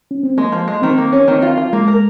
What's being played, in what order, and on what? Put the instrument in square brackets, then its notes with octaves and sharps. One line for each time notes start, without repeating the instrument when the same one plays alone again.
[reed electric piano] C#4
C4
[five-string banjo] G#3 [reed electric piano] A#3
[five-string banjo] F3
G#3
[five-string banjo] D#3 [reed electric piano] C4
[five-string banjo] A#3
C#4
[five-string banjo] D#3 [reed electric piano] C4
[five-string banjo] F4
F4
[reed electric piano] G#3 [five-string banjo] A#3
[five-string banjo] A#4